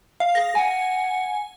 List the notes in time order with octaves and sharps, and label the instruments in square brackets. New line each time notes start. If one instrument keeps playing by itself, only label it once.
[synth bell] F5
[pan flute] G#4 [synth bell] A#6
[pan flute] F#5 [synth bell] G#5